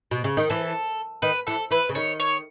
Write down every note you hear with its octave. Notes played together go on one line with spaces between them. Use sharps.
B2
C#3
D#3
E3 A4
D#3 B4
E3 A4
E3 B4
C#3
D#3 C#5
C#5